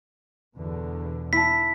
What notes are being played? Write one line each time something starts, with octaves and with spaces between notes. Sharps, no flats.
E2 B2 D3
E4 A5 B6